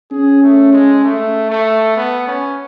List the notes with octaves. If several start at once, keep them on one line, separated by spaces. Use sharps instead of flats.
C#4 G#4
A3
G#3
A3
A3
B3
C#4